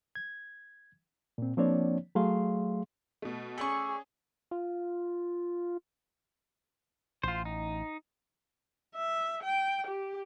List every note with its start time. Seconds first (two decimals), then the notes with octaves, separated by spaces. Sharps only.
0.15 G#6
1.38 A#2 C4
1.57 F3 A#3 C4 D4 C#5 D5
2.15 F#3 A3 G#4 F5 C6
3.22 B2 A3
3.58 A3 C#4 G#4 D5 C#6 F#7
4.51 F4
7.23 A1 F4 C5
7.45 D#4
8.95 E5
9.43 G5
9.87 G4